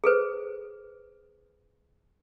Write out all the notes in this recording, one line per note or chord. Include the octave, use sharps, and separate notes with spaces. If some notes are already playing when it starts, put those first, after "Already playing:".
G#4 A4 B4 C5